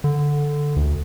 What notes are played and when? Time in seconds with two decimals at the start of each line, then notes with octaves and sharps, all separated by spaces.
0.04 D3
0.76 D2